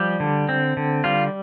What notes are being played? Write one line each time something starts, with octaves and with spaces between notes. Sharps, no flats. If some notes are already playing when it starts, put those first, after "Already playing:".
Already playing: F3 G3 G4
D3
C4
D3
G3 F4